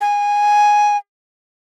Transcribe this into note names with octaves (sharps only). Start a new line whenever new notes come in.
G#5